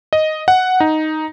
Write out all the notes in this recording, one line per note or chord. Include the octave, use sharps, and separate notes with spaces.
D#5
F#5
D#4